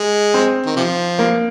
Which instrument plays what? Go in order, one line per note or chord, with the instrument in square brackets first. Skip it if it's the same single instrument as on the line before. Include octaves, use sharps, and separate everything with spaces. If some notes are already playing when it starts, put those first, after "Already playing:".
Already playing: [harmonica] G#3
[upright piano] C4
[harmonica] D#3
C3 F3
[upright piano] A#3